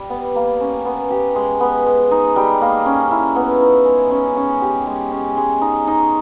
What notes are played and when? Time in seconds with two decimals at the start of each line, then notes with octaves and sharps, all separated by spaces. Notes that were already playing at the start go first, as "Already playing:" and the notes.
Already playing: G3
0.10 B3
0.35 A#3
0.61 C#4
0.85 B3
1.10 G4
1.35 G#3
1.60 B3
1.86 G#3
2.11 D#4
2.36 G3
2.61 A#3
2.86 C#4
3.11 E4
3.36 B3
3.62 D#4
3.86 G#3
4.11 C#4
4.36 C#4
4.62 G4
4.87 G#3
5.11 C#4
5.37 G#3
5.61 D#4
5.87 D#4